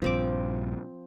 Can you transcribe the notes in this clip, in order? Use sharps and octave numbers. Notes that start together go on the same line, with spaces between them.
A#1 G2 F3 C4 D6